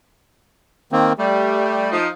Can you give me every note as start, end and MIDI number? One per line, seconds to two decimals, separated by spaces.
0.92 1.13 51
0.92 1.13 58
0.92 1.13 60
1.18 1.87 55
1.18 1.97 57
1.92 2.07 53
1.92 2.07 63